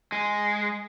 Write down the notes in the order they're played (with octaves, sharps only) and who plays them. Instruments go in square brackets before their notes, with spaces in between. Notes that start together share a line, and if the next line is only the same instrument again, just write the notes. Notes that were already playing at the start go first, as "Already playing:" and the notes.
[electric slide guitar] G#3